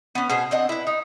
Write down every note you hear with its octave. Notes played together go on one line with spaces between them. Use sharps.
B3 C#4
B2 G#4 C5
C4 D4 D#5 F#5
E4 B4
D#4